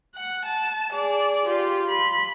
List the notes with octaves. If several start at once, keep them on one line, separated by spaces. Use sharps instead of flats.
F#5
A5
G#4 D5
F4 G4
B5 C6